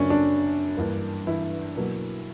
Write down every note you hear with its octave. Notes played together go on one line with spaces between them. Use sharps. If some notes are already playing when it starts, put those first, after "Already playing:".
Already playing: F#2 C#3 F#3 A#3 C#4 D4
D4
G2 E3 A#3
E3 E4
B2 F#3 A#3